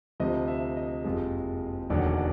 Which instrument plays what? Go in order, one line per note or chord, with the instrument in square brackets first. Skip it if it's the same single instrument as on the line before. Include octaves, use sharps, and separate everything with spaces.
[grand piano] D2 C3 F3 D#5
E5
D#5
F#1 F2 C3 F3 G#3
E1 D#2 D3 F#3 D5
D5